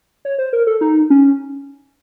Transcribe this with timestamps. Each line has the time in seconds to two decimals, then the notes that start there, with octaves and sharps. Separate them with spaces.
0.25 C#5
0.38 C5
0.53 A#4
0.67 A4
0.81 D#4
1.10 C#4